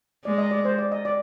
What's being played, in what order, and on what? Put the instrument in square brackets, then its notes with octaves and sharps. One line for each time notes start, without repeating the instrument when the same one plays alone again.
[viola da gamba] G#3 [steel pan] D5
[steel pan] D#5
D5
C5
D5
D#5
D5